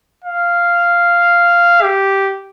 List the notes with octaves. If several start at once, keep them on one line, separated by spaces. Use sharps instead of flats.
F5
G4